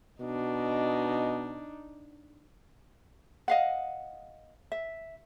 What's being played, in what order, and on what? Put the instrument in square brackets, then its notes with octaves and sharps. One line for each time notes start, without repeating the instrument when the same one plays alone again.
[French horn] B2 [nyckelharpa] D4 D#4
[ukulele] D#5 F5 F#5
E5